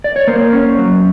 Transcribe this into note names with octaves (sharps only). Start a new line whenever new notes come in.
D5
C#5
A#3 A#4 C5
C#4
F#3